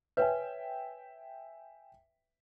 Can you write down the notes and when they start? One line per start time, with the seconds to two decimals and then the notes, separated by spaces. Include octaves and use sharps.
0.17 B4 C#5 E5 G5 G#5